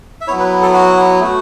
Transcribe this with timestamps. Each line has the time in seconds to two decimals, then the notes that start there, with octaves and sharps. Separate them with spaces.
0.21 E5
0.28 F#3 B3 E4 C#5
0.40 B4
0.62 A4
0.74 F#4
1.20 A3 F#4